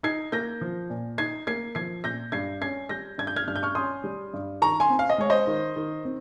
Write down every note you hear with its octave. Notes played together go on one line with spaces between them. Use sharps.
D#4 G#6 C7
A#3 G6 A#6
F3
A#2
D#4 G#6 C7
A#3 G#6 C7
F3 G#6 C7
A#2 G6 A#6
G2 G#6 C7
C#4 G#6 C7
G3 G6 A#6
G2 G#6
G6
F6 G#6
G2 F6
G6
C#6 F6
C#4 C6 D#6
G3
G2
D#3 A#5 C#6
G#5 C6
C4
F5
D#5
G#3 C#5
C5 D#5
D#3
D#3
C4